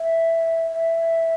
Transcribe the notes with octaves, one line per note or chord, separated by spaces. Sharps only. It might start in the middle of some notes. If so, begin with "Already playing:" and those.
Already playing: E5
E5